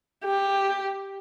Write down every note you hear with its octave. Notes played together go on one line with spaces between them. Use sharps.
G4